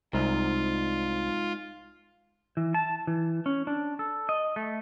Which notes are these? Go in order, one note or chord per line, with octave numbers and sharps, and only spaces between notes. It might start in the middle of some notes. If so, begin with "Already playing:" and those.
C2 G#2 F4
E3
A5
E3
C#4
D4
A4
D#5
A3